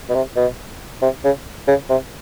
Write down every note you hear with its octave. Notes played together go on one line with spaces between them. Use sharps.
B2
C3
B2
C3
C#3
C#3
C3